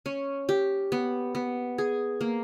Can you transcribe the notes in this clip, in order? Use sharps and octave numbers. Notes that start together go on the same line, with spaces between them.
C#4
G4
B3
B3
G#4
A#3